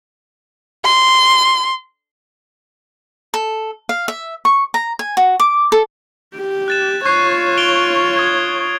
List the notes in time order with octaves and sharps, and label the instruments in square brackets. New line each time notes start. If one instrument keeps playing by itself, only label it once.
[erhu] C6
[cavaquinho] A4
F5
E5
C#6
A#5
G#5
F#4
D6
A4
[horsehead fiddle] G4
[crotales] F#6 A6 E7
[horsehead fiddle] F4 C#5 [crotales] C#6 F#6 C7
[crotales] D7 F7 G7
D#6 G#6